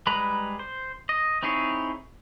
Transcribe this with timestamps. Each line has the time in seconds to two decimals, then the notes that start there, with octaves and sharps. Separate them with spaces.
0.07 G3 G#3 B4 A#5 B5
0.59 C5
1.09 D#5
1.43 C4 D#4 E4 G#4 C#5